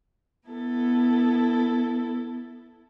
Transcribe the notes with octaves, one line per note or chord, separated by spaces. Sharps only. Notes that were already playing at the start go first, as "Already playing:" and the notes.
B3 E4 A4